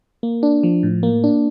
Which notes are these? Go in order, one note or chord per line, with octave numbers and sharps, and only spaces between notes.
A#3
D4
F3
A2
A#3
D4